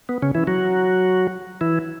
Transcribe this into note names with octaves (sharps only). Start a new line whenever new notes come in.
B3
C#3 C#4
E3 E4
F#3 F#4
E3 E4